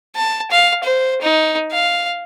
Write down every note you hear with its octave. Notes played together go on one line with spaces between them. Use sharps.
A5
F5
C5
D#4
F5